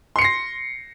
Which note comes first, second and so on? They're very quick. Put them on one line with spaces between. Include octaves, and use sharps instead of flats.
C6 C#7 C7 A#6